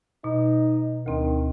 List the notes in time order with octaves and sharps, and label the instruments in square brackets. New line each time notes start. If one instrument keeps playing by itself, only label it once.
[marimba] B2 [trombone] D#4
[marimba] D2 C4 [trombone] D#3